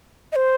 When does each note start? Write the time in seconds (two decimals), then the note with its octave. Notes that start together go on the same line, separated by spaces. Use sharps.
0.32 D#5
0.36 C5